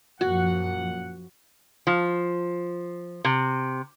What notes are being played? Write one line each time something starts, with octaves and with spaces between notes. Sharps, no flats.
F#2 A#2 F3 F#4 F#5
F3
C3